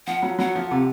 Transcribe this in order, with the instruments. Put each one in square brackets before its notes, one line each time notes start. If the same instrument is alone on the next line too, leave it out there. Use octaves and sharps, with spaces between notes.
[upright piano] F3 [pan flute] F#5
[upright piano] F#3
[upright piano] F#3 [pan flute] F#5
[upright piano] F3
C3